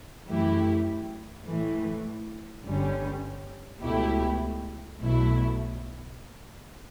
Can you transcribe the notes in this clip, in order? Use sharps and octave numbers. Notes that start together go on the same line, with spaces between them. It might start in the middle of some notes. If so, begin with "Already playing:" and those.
F#2 E3 A3 E4 G4
A2 E3 A3
G1 G2 D3 G3 C#4
C#2 B2 A3 E4 G4
B1 B2 F#3 A3 E4